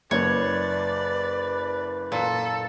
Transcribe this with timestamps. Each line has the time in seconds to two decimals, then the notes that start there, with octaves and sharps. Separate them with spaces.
0.11 F#1 B4 C#5 D5
2.12 A#2 A4